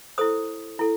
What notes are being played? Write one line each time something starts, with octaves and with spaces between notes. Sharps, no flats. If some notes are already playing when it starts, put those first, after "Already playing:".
E4 A4 C5 D#6
E4 A4